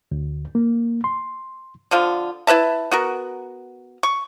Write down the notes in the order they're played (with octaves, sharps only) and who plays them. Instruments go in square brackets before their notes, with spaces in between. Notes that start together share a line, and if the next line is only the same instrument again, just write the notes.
[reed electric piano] D2
A#3
C6
[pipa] D3 F3 F4
E4 B4 E5 A5
B3 F#4 A#4
C#6